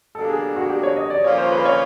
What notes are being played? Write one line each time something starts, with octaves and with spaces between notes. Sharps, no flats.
B2 G3 A#3 D4 A4
G#4
F#4
G4
C#5
D#5
D5
A#2 F3 A#3 C#4 F4 C#5
C5
B4
C#5